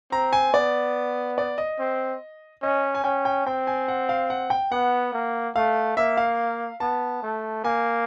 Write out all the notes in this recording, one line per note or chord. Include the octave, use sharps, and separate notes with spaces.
C4 A#5
G#5
B3 D5
D5
D#5
C4
C#4 D#5
G#5
C#4 G5
G5
C4 G5
G#5
F#5
F5
F#5
G5
B3 F#5
A#3
A3 F5
A#3 E5
F5
B3 A5
A3
A#3 G#5